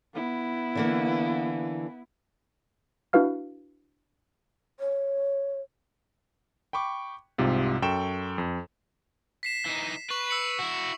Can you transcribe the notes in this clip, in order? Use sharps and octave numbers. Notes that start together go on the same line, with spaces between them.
B3 E4
D3 E3 A#3
D4 E4 F#4 B4 F5 F6
C#5
G5 B5 C#6 D6
C2 G#2 C3 F4
F#2 A4 G5 C#6 E7
F2
B6 C7 E7
E3 D#4
B4 C#6 F#7
E6 C7 C#7
E4 F#4